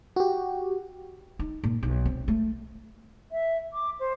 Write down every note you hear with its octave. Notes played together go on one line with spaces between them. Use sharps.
F#4 G4
D#4
A#2
B1
C4
A3
E5
D6
C5